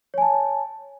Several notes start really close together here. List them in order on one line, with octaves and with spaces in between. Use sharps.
C#5 G#5 A5